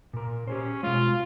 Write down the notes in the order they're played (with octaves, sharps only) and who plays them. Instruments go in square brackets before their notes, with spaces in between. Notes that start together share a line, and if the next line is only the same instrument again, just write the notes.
[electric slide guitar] A#2 A#4
[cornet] C#4 [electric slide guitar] G4 G#4 C5
[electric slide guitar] B2 G#3 [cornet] F4